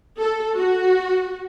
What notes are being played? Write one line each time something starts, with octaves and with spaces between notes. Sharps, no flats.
A4
F#4